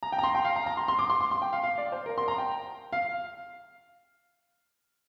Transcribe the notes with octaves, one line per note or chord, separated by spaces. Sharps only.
A#5
G5
A#5
C6
G5
F5
A#5
A#5
C6
C6
D6
C6
C6
C6
G5
F5
F5
D5
C5
A#4
C6
A#5
G5
F5